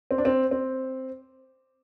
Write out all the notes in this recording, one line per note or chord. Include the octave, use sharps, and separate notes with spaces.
C4
D4
C4
C4